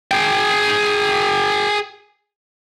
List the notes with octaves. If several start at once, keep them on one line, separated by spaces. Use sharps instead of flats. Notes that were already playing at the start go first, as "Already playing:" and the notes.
G#4 G5